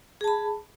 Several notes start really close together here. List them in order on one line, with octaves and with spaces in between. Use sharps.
G#4 A5 B5